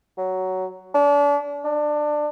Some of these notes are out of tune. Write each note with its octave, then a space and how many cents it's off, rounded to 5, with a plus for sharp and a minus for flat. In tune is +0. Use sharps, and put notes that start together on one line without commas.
F#3 +10
D4 -35
D4 +20